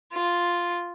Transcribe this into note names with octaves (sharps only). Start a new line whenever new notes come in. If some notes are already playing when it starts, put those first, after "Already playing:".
F4